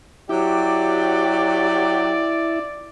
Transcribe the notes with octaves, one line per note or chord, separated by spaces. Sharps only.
F#3 E4 F#4 G4 D5